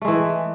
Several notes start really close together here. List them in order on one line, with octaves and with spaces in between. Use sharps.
A3 G#3 E3